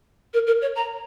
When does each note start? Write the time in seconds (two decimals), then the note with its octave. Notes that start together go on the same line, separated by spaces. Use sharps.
0.33 A#4
0.46 A#4
0.61 C#5
0.75 A#5